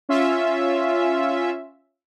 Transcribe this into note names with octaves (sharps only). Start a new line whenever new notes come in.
C#4 F4 E5